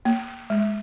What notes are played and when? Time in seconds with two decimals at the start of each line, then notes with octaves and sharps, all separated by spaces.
0.05 A#3
0.50 G#3